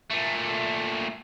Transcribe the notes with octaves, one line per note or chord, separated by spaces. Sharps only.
A#2 A3